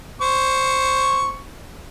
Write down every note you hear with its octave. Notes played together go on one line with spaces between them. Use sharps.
C5 C#6